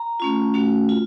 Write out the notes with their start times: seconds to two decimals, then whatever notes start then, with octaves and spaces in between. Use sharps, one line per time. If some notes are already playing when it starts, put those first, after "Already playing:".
Already playing: A#5
0.20 A3 C#4 F4
0.54 A3 C#4 F#4
0.89 F4